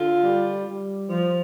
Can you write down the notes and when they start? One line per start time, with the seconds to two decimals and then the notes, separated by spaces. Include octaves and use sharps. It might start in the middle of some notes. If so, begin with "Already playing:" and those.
Already playing: D3 F4
0.24 G3
0.66 G3
1.10 F3